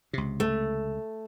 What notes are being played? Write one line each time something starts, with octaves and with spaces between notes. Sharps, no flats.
C#2 C3
A3